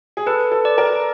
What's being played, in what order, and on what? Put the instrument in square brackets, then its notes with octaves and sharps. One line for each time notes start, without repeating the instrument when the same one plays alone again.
[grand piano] G#4
[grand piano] A4 [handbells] B4
[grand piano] A4
[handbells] D5
[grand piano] A#4